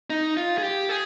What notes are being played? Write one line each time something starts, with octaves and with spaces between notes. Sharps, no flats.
D#4
F4
G#4
G4
G#4